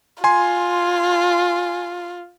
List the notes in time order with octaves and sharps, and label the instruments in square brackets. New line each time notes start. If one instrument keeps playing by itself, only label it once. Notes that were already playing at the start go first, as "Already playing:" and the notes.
[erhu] F4 [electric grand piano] G#5 C6